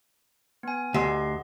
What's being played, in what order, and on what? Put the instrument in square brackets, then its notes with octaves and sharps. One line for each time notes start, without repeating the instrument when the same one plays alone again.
[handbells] B3 G#5
[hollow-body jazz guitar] D2 [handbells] G4 D#5 C6